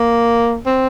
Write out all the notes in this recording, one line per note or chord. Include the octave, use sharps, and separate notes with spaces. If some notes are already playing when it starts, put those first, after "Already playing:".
Already playing: A#3
C4